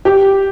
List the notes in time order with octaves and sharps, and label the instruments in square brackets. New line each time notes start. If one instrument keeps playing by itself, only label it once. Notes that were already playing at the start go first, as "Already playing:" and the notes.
[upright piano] G4